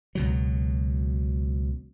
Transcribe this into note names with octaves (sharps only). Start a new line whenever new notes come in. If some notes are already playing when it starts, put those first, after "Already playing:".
C#2 B2 F#3